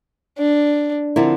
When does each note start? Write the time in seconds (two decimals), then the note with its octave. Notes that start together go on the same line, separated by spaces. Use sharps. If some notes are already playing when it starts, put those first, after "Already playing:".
0.38 D4
1.16 D3 F3 C4 E4 A#4